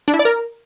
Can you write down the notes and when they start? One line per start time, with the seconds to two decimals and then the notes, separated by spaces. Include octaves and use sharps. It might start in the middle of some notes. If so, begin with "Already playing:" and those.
0.08 D4
0.14 E4
0.19 D5
0.25 A#4